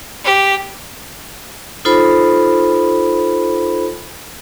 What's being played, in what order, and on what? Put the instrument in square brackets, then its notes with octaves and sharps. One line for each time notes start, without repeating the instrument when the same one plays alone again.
[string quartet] G4
[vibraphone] D#4 F4 A4 C5 B5